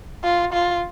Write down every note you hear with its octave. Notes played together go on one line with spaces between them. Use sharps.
F4
F4